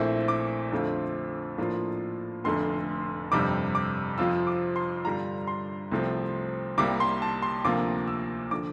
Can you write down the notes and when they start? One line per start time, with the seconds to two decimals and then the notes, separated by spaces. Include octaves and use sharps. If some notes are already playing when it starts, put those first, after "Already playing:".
Already playing: A#1 A#2 A3 C4 E4
0.28 D6
0.72 F2 D3 A3 C4 F4
1.58 A2 F3 A#3 D4 F4
2.44 F1 F2 D3 A3 C6
3.32 G1 F2 C3 G3 D6
3.75 D6
4.18 F2 C3 F3 C4 F4 E6
4.47 D6
4.76 C6
5.04 G2 D3 G3 D4 F4 A#5
5.47 C6
5.92 C2 C3 F3 A3 C4
6.78 C2 C3 G3 A#3 D6
7.00 C6
7.22 A5
7.42 C6
7.65 D2 C3 F3 A#3 D6
8.08 E6
8.51 D3 F3 D6